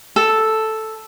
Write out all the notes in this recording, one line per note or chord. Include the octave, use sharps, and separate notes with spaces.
A4